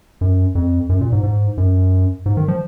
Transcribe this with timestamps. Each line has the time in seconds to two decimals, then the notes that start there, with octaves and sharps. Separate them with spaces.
0.21 F#2
0.55 F2
0.89 F#2
1.01 A#2
1.12 G#2
1.23 G#2
1.57 F#2
2.26 G#2
2.37 D#3
2.48 F3